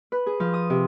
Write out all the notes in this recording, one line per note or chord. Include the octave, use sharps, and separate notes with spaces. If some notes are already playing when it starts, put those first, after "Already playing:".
B4
G#4
F3
D#6
C3